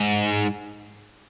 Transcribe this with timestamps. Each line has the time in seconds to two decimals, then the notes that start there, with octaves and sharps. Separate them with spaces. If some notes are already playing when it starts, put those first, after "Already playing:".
Already playing: G#2